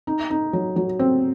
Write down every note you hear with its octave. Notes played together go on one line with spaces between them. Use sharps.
D#4
D#4
F#3
F#3
C4